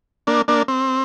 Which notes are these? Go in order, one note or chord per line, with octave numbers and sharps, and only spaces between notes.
A#3 D4
A#3 D4
C4